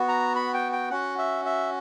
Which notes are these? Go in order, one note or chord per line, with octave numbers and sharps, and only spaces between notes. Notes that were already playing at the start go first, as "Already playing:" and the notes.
Already playing: B3 F#4
A#5
B5
G5
G5
C#4 F#4 F#5
E5
E5